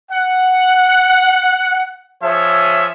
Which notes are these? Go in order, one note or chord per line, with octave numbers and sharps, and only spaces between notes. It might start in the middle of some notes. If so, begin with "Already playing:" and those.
F#5
F3 G#4 C#5 E5